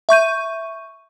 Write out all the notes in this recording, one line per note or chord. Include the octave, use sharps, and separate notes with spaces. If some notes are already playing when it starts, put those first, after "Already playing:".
E5 C#6 G6 D#7